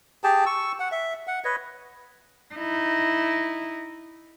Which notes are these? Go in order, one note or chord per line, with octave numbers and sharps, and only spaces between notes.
G4 G#4 G5 A5
C#6 E6
F#5
E5
F#5
B4 C#5 D#5
D#4 E4